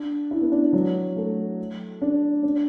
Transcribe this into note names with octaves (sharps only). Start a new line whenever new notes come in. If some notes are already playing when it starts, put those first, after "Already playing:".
Already playing: D4
E4
B3
D4
F#3
A3
D4
D4